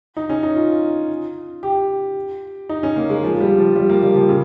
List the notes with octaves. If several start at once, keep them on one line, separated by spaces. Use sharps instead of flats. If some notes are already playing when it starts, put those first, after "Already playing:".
D#4
C#4
D#4
F4
G4
D#4
C#4
A#3
G#3
F3
G3
F3
G3
A#3
G3
F3
C#3